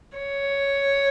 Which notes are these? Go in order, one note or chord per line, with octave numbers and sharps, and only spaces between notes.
C#5